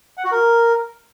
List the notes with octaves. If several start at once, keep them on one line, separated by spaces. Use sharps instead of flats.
F#5
F#4
A#4